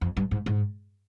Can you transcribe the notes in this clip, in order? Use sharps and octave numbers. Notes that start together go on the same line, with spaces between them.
F2
G2
G#2
G#2